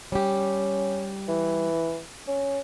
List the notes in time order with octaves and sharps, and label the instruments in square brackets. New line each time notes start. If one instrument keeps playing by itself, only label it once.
[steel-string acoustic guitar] G3 G4 [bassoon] C#4
[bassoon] E3
C#4